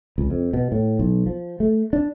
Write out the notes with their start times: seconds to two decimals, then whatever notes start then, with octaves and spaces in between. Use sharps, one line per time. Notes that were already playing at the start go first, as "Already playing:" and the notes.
0.18 C#2
0.30 F2
0.53 B2
0.72 A2
0.99 B1
1.26 F3
1.60 A3
1.93 D4